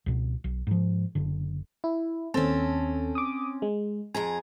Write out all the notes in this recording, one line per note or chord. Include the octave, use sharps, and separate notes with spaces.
C#2 B2
B1
G#2 F3
F#1 D3
E4
D#2 C4 C#4 A4 A5
D6 D#6
G#3
F2 G#4 G#5 A#5